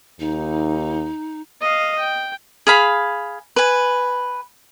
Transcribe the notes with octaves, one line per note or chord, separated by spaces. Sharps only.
D#2 D#4
D#5 F5
G5
G#4 F5 B5
B4 G#5